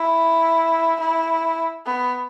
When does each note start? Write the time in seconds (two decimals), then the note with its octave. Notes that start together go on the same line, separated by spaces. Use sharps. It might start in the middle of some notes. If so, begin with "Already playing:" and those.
Already playing: E4
1.00 E4
1.86 B3